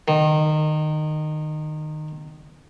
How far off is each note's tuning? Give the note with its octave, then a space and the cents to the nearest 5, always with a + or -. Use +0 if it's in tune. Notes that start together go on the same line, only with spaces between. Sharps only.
D#3 -20